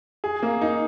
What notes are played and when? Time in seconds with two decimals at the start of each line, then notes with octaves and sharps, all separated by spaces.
0.24 G#4
0.43 A#3
0.61 D#4